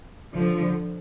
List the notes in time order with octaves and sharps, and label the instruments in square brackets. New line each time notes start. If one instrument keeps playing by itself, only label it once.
[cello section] D3 F3